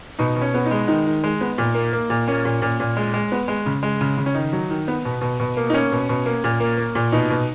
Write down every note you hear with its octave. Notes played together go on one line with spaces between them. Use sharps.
B2 D#4
B2
C#4
B3
D#4
G#3
D#3 D#4
D#3
G#3
B3
A#2
A#3
A#3
A#2
A#3 C#4
A#2
A#2
A#2
G#3
G#3
B3
G#3
C#3
G#3
C#3
C#3
C#4
D#3 D#4
F#3
D#3
B3
B2
B2
B2
A#3
D#4
A#3 C#4
B2
B2
A#3
A#2
A#3
A#3
A#2
B2 D#4
B2